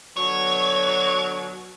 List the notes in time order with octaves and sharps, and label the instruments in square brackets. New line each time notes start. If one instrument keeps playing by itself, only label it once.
[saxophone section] B2 D3 F#3 [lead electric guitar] C#5